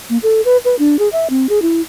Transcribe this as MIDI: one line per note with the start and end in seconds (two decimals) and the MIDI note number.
0.10 0.18 58
0.23 0.41 69
0.45 0.57 71
0.65 0.75 71
0.79 0.97 62
0.99 1.09 68
1.13 1.27 76
1.30 1.47 60
1.49 1.59 68
1.62 1.82 64